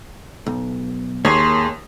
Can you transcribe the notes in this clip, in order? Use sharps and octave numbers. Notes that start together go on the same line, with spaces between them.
B1
D#2 A#3 G#4 C#5 C6